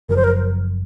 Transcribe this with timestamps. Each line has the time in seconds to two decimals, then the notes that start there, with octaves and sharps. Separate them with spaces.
0.09 F#1 F#2 F3 A#4
0.16 C5
0.24 A#4